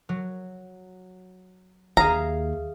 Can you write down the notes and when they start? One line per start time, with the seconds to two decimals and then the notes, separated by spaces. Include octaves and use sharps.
0.09 F#3
1.97 D#2 G#4 E5 F5 A#5